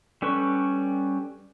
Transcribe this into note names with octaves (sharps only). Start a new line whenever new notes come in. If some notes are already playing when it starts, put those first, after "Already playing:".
G3 C#4 A4 B4 C#6